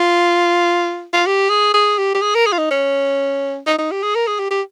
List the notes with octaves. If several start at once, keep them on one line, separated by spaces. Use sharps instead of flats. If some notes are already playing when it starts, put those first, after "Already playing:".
Already playing: F4
F4
G4
G#4
G#4
G4
G4
G#4
A#4
G#4
F4
D#4
C#4
D#4
D#4
G4
G#4
A#4
G#4
G4
G4